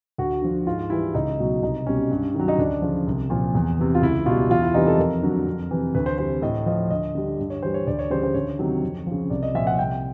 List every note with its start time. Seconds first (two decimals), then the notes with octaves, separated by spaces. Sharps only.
0.18 D2 F#4
0.42 D3 F3
0.67 G#2 F4
0.90 E3 G3 E4
1.14 C#2 D#4
1.39 B2 F#3
1.62 C2 D#4
1.87 B2 G3 C#4
2.11 G2
2.34 D#3
2.39 F#3
2.48 D#4
2.58 D2 D4
2.82 C#3 F3
3.07 C2
3.30 A#2 F3
3.55 E2
3.79 C3 E3
3.95 F4
4.02 C#2 E4
4.26 B2 F4
4.31 G3
4.50 E2 F4
4.62 E4
4.74 C3 E3 G3 D#4
4.87 A4
4.98 F2 A#4
5.23 D3 F#3
5.46 F2
5.71 C3 E3
5.95 D2 B4
6.06 C5
6.18 C3 E3 G3 C5
6.42 A2 D#5
6.66 F3 D#5
6.90 D2 D#5
7.15 D3 G3
7.39 G2
7.50 C#5
7.62 E3 G3 C5
7.74 C#5
7.87 D2 D5
7.99 C#5
8.10 C#3 E3 G3 C5
8.23 C5
8.34 D2 C#5
8.59 C3 D#3 F#3
8.83 F2
9.07 C#3 F3
9.30 C2 D5
9.43 D#5
9.54 A#2 F3 E5
9.67 F#5
9.79 C2 G5